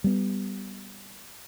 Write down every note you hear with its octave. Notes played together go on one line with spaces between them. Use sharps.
G3 B3